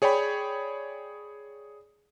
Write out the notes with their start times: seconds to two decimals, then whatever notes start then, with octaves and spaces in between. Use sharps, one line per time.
0.02 G#4 C#5 D5 G5 B5